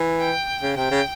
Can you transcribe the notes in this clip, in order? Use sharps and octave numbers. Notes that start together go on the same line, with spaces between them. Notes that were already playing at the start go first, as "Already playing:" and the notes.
Already playing: E3
G5
C#3
C3 G5
C#3